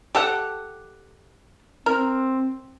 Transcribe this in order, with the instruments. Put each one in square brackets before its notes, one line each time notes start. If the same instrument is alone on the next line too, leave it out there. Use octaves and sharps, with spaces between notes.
[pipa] G4 A4 F#5
[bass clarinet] C4 [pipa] A#4